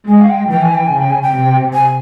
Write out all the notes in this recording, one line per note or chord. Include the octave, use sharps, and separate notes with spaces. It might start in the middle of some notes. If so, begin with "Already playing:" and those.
G#3 G#5
F5
G5
E3 G5
G#5
G5
C#3 G#5
G5
G#5
G5
C3
G#5